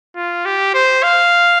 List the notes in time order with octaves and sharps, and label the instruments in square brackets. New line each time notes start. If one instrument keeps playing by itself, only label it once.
[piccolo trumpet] F4
G4
C5
F5